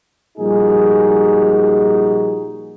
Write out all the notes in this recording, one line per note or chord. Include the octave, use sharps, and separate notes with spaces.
A#2 F3 G3 D#4 F#4 G#4